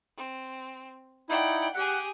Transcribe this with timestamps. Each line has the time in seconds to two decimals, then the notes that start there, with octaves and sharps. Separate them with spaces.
0.17 C4
1.29 D#4 E4 D5 F#5 G5
1.74 G4 G#4 F#5